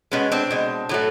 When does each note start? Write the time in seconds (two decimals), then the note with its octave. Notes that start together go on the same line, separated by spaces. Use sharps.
0.11 B2 G#3 B3 C#4
0.32 C4 D4
0.50 B2 G#3
0.89 A2 F#3 A3